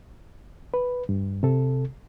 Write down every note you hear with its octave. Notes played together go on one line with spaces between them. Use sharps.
B4
G2
C3 A4